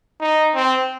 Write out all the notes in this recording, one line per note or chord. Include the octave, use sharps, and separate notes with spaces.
D#4
C4